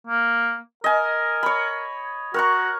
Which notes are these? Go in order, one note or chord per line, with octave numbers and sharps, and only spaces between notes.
A#3
A#4 D#5 G#5
C#5 B5
F#4 A#4 A#5 C#6